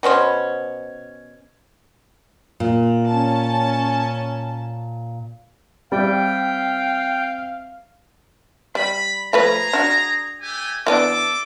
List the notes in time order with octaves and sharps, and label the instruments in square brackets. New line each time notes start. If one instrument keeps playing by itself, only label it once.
[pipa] B2 B3 C#4 C5
[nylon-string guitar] A#2
[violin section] C#4 A5
[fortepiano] G3 [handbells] C4 E5 [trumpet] F5 [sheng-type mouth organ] G5
[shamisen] G3 [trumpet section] B5
[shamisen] F3 A3 B4 [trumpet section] G#4 A#5
[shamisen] D4 F#4
[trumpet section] A3 G4 G#5
[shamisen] E3 B3 D4 [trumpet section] A4 D6